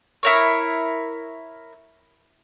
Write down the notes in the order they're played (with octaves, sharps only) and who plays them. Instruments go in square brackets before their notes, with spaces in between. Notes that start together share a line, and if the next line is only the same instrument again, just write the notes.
[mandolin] E4 A#4 C#5